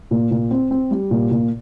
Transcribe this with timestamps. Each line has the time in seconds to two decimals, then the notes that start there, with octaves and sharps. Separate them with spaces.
0.11 A#2
0.31 A#2
0.51 C4
0.71 C4
0.91 G3
1.11 A#2
1.31 A#2